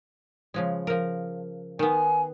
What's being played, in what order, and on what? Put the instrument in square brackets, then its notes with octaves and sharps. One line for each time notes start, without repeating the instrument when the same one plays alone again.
[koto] C#3 F3 G#3
F3 A#4
[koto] D#3 B3 [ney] G#5